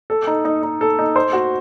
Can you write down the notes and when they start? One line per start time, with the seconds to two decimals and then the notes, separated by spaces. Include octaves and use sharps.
0.10 A4
0.27 D#4
0.45 D#4
0.63 D#4
0.81 A4
0.99 D#4
1.16 C5
1.33 F#4